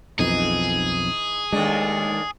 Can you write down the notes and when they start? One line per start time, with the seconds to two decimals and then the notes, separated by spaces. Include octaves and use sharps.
0.19 B1 F2 E3 D#4 G#4
1.53 D#2 G#3 A3 D4